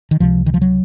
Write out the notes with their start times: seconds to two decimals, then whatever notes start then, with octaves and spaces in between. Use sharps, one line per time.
0.11 D#3
0.20 C#2 C3 F3
0.46 D#3
0.54 F3
0.62 F#3